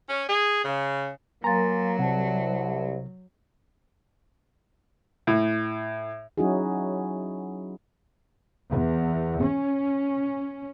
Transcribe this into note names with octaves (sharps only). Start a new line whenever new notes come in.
C#4
G#4
C#3
F#3 A#3 G#5 A#5 C6 A6
C2 C3 F#5 A5
A2
F#3 C#4 D#4 E4 F#4 G#4
E2
C#4